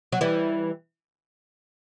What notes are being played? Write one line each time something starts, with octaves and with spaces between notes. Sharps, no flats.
F#3
E3 G3